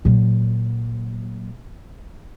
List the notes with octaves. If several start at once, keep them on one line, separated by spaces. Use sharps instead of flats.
A#2 F#3